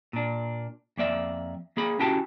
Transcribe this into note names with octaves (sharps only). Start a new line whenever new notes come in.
A#2 D4
F2 A#3 D5 E5
A#3 G#4 B5
C#4 E4 F#4 G4 G5 A5